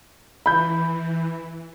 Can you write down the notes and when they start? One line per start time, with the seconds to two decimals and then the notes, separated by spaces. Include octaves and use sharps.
0.46 E3 B5 G6